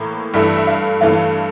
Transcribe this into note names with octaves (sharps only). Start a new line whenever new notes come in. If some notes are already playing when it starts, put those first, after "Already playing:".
Already playing: A2 E3 A#3
G2 E3 A3 E5
E5
F5
G2 E3 A3 F5